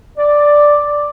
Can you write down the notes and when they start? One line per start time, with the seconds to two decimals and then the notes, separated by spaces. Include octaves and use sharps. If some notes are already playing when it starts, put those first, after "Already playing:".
0.18 D5